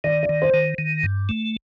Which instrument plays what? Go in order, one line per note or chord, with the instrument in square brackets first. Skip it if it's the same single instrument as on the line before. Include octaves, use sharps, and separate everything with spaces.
[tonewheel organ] D#3 [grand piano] D5
[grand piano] D5
[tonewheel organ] D#3
[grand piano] C5
[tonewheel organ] D#3
D#3
G2
A3